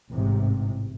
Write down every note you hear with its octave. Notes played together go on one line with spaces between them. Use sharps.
A1 G#2 C3